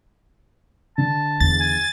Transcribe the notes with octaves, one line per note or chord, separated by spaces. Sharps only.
D3 A5
E2 A6
G#5